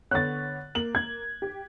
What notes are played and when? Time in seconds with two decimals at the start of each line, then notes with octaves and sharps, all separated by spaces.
0.11 D3 B3 C#5 F#6 A6
0.75 A#3 F#7
0.95 G#6
1.42 G4